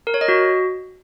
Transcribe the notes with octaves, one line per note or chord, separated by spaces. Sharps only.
A#4
C#5
D#5
F#4